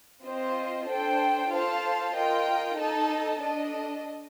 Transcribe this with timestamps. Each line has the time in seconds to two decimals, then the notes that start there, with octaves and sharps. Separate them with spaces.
0.24 C4 F4 C5 D#5
0.88 D4 A4 C5 G5
1.52 F4 A4 C5 F5 A5
2.14 F4 A#4 D#5 G5
2.78 D#4 A4 D#5 A5
3.40 D4 A4 D#5